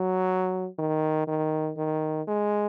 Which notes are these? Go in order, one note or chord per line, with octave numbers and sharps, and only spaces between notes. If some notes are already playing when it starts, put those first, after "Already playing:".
Already playing: F#3
D#3
D#3
D#3
G#3